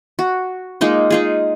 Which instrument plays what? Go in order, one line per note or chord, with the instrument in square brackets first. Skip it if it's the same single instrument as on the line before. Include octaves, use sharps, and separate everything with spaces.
[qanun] F#4
G#3 A#3 D#4 F4
D#4 F4 G#4